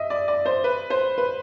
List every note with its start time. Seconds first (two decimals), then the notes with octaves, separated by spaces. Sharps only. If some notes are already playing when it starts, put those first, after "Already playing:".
Already playing: D#5 E5
0.10 D5
0.28 D5
0.46 C5
0.64 B4
0.90 C5
1.18 B4